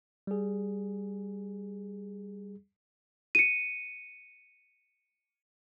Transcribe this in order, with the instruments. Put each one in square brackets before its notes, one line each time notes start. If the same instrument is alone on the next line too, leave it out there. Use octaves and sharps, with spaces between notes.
[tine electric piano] G3 G#4
[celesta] C#7 D#7